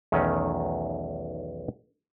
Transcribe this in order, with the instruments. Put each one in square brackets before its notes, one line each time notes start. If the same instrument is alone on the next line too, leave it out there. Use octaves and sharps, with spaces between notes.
[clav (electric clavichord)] B1 E2 D#3 A3 C#4 D#5